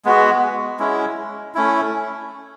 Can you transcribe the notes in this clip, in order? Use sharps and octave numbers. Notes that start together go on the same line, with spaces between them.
G#3 B3 F#4
G#3 C#4 E4
A3 C#4 E4